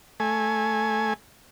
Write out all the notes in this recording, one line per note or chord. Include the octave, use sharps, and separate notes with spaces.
A3 G#5